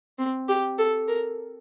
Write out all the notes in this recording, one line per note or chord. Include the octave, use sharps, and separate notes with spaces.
C4
G4
A4
A#4